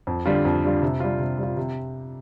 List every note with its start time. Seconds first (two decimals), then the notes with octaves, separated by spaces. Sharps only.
0.07 F2
0.26 D3 G3 F4
0.45 F2
0.64 D3 G3 F4
0.82 C3
1.00 G3 F4
1.19 C3
1.38 G3 F4
1.57 C3